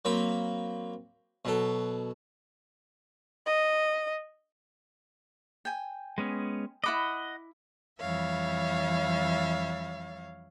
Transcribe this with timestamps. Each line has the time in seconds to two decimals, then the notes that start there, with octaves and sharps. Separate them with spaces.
0.05 F#3 A#3 C4 B5
1.45 B2 F#3 A4
3.46 D#5
5.65 G5 G#5
6.18 G#3 B3 C#4
6.84 E4 D#5 F#5 B5 D6
8.00 F2 E3 G3 C#5 E5 F5